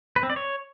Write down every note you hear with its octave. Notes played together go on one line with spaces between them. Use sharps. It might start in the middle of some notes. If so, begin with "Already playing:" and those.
B4
C4
D5
C#5